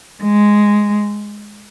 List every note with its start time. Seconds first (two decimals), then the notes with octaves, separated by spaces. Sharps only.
0.23 G#3